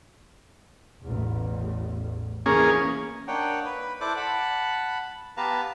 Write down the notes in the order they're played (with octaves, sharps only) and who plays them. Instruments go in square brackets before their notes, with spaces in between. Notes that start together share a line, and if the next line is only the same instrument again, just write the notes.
[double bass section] A1 E2
[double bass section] E3 [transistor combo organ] A#3 C#4 G#4
[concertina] A#3 D4 D#4 C#5 F#5 G5
B4
E4 A4 C5 D5 D6 F#6
F#5 A5 B5
B3 G4 B4 F5 A5 A#5